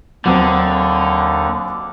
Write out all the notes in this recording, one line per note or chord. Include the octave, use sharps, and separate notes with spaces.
D#2 D3 F#3 C4 C5